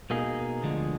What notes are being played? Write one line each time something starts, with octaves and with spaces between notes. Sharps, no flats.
B2 A#3 D#4 G#4
D2 D3 F3 G#3